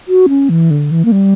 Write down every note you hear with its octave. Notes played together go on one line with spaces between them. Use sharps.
F#4
C#4
E3
D3
E3
A#3
G3